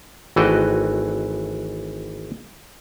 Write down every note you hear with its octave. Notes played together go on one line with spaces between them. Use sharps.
G#1 E3 A3 F#4 D#5 G5